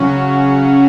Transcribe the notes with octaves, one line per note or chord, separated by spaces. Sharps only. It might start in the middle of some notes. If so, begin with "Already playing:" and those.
Already playing: C#3 F#3 C#4 F#4